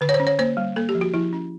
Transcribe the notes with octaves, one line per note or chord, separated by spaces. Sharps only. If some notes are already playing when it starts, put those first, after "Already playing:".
D3 B4
C#5
C5
C#4
C#5
A#3 C5
G3
A#3 A4
G4
F3
F#4
F3 E4
C#4